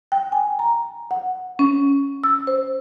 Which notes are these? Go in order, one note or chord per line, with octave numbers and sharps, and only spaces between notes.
G5
G#5
A#5
F#5
C#4
E6
C5